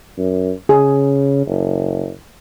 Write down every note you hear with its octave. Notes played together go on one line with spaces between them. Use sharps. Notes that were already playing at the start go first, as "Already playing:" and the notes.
F#2
C#3 G#4
F#1